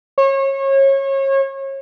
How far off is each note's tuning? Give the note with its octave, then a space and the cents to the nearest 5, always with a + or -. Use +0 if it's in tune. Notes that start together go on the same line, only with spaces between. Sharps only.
C#5 -30